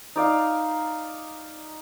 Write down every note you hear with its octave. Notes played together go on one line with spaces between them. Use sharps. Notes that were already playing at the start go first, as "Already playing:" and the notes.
D#4 D5 F5